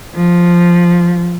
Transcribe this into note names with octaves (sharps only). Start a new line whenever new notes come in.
F3